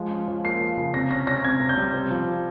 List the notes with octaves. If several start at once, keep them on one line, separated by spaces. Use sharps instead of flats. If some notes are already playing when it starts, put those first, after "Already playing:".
Already playing: F3 G#3
C#4
F3
A#3 C7
F3
C#3
C3 A#6
C#4 A#6
C#4 A#6
C3 G#6
C3
G6
G3
C4
F3